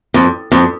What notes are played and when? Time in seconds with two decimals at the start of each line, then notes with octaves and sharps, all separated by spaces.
0.14 F2
0.52 F2